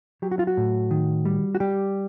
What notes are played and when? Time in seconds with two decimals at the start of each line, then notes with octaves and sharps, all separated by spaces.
0.22 F#3 G4
0.31 F#4
0.39 F4
0.47 F#4
0.57 A2
0.91 D#3
1.25 G3
1.55 F#4
1.60 G3 G4